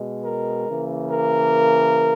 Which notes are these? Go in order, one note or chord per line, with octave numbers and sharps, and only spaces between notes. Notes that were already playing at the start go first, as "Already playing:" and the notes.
Already playing: B2 G#3
A#4
C#3 E3 A#3
A#4